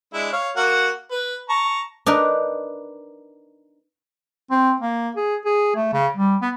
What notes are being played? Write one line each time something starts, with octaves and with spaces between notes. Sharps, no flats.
G#3 D4 E4
C#5 F5
A#3 F#4 F#5
B4
A5 A#5 C#6
D4 D#4 A#4 B4
C4
A#3
G#4
G#4
A3
C#3
G3
B3